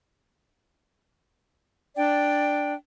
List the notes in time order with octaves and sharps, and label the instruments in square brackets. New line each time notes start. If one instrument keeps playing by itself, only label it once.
[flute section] D4 D5 G5